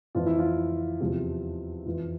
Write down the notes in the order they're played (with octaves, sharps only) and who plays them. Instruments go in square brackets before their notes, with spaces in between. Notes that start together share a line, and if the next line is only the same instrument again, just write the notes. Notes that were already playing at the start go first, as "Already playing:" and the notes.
[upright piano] F2 E3 F4
E4
F4
E2 C3 F3
F2 E3 F4